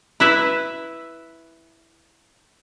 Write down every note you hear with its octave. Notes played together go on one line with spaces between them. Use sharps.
E4 B4 E5